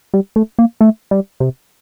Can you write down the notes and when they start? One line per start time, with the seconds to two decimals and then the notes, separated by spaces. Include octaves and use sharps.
0.14 G3
0.36 A3
0.59 A#3
0.81 A3
1.11 G3
1.40 C3